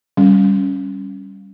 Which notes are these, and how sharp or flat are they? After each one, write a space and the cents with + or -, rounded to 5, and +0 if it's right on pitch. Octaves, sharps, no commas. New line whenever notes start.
G3 +0 C#4 -5